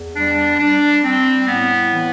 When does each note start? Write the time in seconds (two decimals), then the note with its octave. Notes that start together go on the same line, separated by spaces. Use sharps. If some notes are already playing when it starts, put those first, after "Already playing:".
Already playing: E2
0.16 G3 D4
0.59 G3 D4
1.03 G3 C4
1.47 A2 B3
1.90 E3